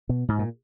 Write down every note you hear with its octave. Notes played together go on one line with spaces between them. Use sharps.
B2
G#2
A#2